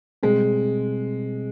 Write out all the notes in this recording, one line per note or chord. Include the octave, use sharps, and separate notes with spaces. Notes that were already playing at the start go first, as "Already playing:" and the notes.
B2 G3 G#3 C4